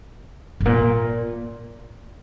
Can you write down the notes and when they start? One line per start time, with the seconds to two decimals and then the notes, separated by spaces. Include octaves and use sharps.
0.60 G#2
0.65 A#2